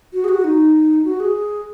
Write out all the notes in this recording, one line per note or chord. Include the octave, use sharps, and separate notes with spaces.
F#4
G#4
F#4
D#4
F#4
G#4